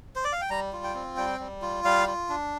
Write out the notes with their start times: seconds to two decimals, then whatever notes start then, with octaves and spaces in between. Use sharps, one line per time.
0.16 C5
0.24 D5
0.33 F5
0.41 G5
0.50 G3 A#5
0.73 F4
0.84 G5
0.94 C4
1.17 G3 G5
1.39 G3
1.62 F4
1.85 G3 F5
2.07 F4
2.29 D4